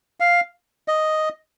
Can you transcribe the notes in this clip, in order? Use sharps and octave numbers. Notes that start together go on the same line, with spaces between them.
F5
D#5